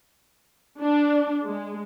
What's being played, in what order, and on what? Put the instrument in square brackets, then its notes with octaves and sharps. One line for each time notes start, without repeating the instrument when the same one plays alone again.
[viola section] D4
G#3